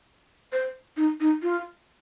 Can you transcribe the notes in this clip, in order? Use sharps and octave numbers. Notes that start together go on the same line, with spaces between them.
C5
D#4
D#4
F4